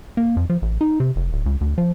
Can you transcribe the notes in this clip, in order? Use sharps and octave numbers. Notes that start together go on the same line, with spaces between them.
A#3
F2
F3
A1
D#4
C3
F1
D1
C#2
D2
F3